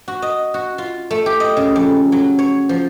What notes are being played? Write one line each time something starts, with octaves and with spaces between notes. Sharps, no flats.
F#4
D#5
F#4
F4
A3
G4
D#5
C#3
F2
F#3
C#5
F3